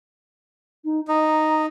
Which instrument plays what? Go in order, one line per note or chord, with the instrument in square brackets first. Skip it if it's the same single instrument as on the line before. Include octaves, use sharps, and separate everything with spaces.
[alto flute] D#4
[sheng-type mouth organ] D#4 [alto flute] A#5